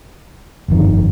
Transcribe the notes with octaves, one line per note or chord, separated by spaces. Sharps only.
G1 F2 D#3